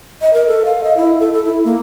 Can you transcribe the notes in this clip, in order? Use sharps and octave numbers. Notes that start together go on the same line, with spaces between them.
D#5
A#4
A4
F5
D#5
E4
A4
A4
E4
A#3